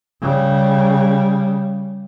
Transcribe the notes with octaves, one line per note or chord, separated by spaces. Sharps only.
C#3 G3